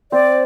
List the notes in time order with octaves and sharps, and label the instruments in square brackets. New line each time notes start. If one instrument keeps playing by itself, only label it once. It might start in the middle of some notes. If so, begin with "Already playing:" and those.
[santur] C4 [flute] D5